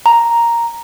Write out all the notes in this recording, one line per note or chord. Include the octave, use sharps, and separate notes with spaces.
A#5